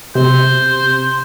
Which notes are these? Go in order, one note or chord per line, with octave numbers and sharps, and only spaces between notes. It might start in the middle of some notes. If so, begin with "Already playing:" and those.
C3 C5